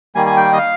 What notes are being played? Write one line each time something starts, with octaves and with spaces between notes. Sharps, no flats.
D#3 G3 A#3 G#5
G#5
G5
D#5
F5